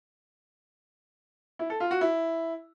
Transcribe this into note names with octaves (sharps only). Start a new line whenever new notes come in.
E4
A4
F4
F#4
E4